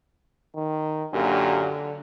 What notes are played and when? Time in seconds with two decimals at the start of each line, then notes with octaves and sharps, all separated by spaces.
0.56 D#3
1.14 F#2 A#2 D3 A#3 G4